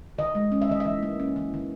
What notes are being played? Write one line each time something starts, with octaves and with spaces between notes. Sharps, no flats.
D#3 D#5
G#3
C#4
E5
D#3 D#5
E5
E3
A#3
C#4
E3
D#3